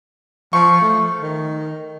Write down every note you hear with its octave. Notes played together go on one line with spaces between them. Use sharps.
F3 C#6
A3
D#3